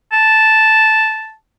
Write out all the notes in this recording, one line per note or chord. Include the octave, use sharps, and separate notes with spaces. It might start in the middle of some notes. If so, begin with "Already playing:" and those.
A5